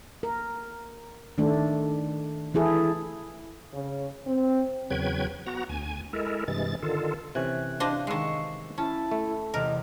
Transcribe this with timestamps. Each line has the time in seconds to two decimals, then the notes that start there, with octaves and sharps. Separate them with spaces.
0.23 A#4
1.38 D#3 A3 D4
2.54 E3 E4 G#4 A4
3.73 C#3
4.27 C4
4.90 E2 C#3 F#3 B4 G5 G#6
5.46 B3 F#4 A#5
5.69 D2 G#5
6.13 G#3 E4 A4 A#4
6.48 G2 C3 E3 G#3 A6
6.82 D3 D#3 F4 A4
7.35 C3 E3 C#4 F#6 G#6 D#7
7.80 D4 C5 D#5 F5
8.07 D#3 G#3 C#6 E6 C7
8.78 C#4 E4 A5
9.11 A3
9.54 E2 C3 A#4 D#5